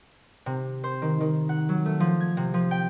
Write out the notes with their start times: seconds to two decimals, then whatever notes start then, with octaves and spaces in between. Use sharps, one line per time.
0.46 C3
0.84 C5
1.02 D#3
1.21 D#3
1.49 F#5
1.69 F#3
1.86 A3
2.00 F3
2.20 G#6
2.37 C3
2.54 F3
2.71 G5